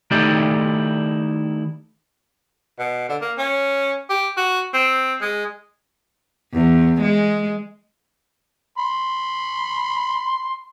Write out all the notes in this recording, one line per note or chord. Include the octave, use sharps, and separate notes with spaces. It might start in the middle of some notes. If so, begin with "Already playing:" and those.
D#3 A3 D#4 E4 G4 D5
B2
D3
A#3
C#4
G4
F#4
C4
G#3
E2
G#3
B5 C6